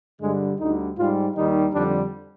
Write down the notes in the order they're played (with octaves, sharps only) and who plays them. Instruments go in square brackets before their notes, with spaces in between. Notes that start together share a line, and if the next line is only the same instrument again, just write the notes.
[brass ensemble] G2 D3 G3 G#3
D2 D3 G3 D#4
G#2 G3 F4
D#2 D#3 G3 D#4
F2 D3 G3 D4